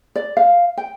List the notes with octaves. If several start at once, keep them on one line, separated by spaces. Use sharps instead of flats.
D5
F5
G5